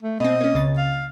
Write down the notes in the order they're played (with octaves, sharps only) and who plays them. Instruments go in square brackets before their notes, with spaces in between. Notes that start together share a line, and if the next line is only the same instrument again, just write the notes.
[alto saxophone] A3
[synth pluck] B2 C4 [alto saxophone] D#5
[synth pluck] A#3 C#4
C#2 C#3 A6
[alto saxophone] F5